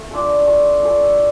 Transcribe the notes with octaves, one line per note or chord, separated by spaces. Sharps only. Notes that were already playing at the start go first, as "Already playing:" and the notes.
Already playing: A3
D4 F4 A4
A3
D4 F4 A4